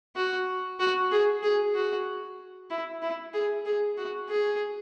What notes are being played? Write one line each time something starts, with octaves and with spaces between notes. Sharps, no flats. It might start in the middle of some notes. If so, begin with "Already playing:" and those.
F#4
F#4
G#4
G#4
F#4
E4
E4
G#4
G#4
F#4
G#4